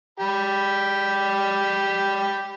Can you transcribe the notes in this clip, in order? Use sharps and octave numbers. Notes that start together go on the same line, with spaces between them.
G4 B5